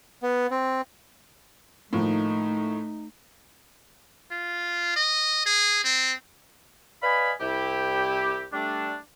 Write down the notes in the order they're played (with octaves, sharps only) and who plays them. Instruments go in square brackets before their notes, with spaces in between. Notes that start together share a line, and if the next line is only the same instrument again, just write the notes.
[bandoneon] B3
C4
[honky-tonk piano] A2 [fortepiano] D#3 F3 A#3 [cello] A3 [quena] D#4
[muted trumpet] F4
D#5
G#4
C4
[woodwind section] B4 D5 D#5 F5 G#5 B5
C2 E4 G4
G3 A3 D4